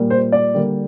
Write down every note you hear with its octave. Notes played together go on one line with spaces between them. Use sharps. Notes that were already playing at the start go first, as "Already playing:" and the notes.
Already playing: A#2 G3 A#3
C5
D5
D3 G3 A#3